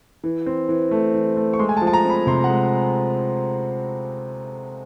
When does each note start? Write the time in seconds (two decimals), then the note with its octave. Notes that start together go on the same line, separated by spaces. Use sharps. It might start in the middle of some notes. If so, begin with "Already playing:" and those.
0.24 E3
0.46 C4
0.69 E3
0.91 A3
1.14 E3
1.37 A3
1.53 C#6
1.59 G#3 C6
1.69 G#5
1.77 A5
1.81 F3
1.87 A5
1.93 A#5
2.05 C4
2.10 B5
2.27 C3 C6
2.44 F#5
2.50 G#3